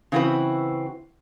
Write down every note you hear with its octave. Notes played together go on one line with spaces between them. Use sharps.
C#3 E3 C4 E4 F#4 B4